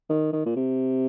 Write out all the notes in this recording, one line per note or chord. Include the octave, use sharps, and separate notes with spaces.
D#3
D#3
A#2
C3